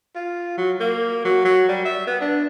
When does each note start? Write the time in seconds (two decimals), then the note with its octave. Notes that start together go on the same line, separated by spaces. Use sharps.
0.15 F4
0.57 F#3
0.80 A#3
1.25 F#3
1.45 F#3
1.68 G3
1.85 E5
2.07 B3
2.21 D4